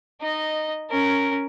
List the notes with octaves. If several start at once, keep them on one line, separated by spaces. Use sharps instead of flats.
D#4 D#5
C#4 A#4